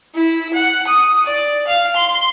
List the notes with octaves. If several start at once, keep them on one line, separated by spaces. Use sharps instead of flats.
E4
F#5
D#6
D5
F5
C6